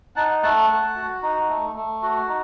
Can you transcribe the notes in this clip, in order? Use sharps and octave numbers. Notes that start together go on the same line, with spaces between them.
D#4 F#5 A5
A3 F#5 A5
A3
F#4
D#4
A3
A3
F#4
D#4